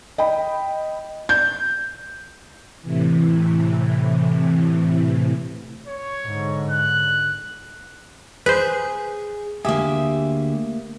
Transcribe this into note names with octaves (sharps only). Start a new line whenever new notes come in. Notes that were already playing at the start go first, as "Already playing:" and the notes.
D#5 G5 B5
G6
A2 C3 E3
C#5
G#2 D3
F#6
G#4 B4 C5
D2 A#3 G4 G#4 E5